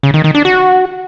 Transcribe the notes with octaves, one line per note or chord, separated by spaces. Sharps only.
C#3
D#3
D#3
D4
F#4